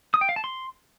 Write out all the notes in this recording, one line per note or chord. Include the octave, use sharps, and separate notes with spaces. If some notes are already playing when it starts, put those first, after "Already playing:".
D#6
G5
F5
A5
C6